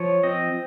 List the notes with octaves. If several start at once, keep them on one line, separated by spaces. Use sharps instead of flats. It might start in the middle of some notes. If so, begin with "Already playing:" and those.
Already playing: F3 C#5
C4 D#5